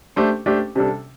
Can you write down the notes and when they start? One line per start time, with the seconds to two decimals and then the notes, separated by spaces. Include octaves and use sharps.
0.16 A3 D4 G4 C5
0.46 A3 D4 G4 C5
0.76 C3 G3 D4 A4